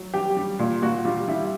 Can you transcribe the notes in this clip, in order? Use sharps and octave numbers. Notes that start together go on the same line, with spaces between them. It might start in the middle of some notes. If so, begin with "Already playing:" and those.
Already playing: F#3
G3 G4
G3
A#2
A#2 F#4
G3 F4
G3 E4